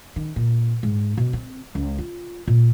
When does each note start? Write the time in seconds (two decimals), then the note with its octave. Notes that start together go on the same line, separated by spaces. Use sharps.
0.16 D#3
0.36 A#2
0.83 G#2
1.17 B2
1.33 C4
1.75 C#2
1.98 F4
2.48 A#2